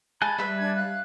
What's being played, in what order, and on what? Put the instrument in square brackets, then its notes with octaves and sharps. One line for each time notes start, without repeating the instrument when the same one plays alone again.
[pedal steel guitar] G#3 G#5 F#6 [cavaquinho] A5 [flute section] B5
[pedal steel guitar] G3 [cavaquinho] B4 E5
[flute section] D4 A5 G#6
F5 F#6